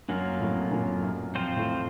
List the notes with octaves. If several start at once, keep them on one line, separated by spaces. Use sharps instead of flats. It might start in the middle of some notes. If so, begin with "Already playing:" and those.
F#2 F#3 A#3 F4
F2 A2
F#2 A#2
F#2
F2 F3 C4 F4 C5
F2 A2